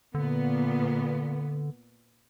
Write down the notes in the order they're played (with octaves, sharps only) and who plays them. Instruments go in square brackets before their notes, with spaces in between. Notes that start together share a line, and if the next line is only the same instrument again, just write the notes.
[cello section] A#2 B3 [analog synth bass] D3